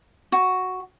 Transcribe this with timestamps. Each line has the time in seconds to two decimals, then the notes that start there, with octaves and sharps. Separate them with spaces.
0.32 F#4